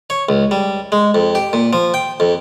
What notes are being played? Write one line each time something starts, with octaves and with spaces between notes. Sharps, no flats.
C#5
C#2
G3
G#3
F2
G4
A#2
F3
G5
F2